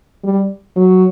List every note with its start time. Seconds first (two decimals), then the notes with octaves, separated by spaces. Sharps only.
0.24 G3
0.76 F#3